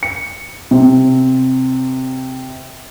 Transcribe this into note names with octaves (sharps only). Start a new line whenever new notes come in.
C#7
C3